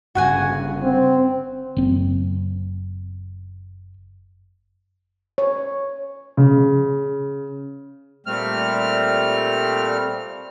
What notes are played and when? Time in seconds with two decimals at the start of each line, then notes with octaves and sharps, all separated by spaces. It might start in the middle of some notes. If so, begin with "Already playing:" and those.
0.15 G1 G2 C#3 F#4 F#5 G#5
0.82 C4
1.77 F#1 C4
5.38 C#5
6.37 C#3
8.26 A#2 G3 A3 C4 F6